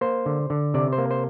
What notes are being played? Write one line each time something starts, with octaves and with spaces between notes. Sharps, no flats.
A#3 C5
D3
D3
C3 D5
C5
A#3
C5